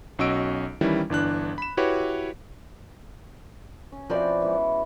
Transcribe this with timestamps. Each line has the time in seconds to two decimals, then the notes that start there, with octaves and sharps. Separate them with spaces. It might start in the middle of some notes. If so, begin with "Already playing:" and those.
0.19 B1 C#4 F#4 D#5 E6 D7
0.81 D#3 E3 G3 C#4 E4
1.10 G1 E3 D4 F#6
1.58 B5 E7
1.77 E4 F#4 G4 B4 C#5
3.92 C#4
4.10 F3 C4 E4 F#4 B4 D5
4.42 E3 G#3 B3